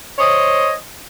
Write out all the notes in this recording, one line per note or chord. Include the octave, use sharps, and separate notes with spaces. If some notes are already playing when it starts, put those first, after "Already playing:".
C5 C#5 D#5